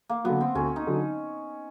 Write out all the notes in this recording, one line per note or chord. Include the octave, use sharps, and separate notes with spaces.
A#3
D3 F#3 B3
C4
D2 C#4
D#4
D3 F#3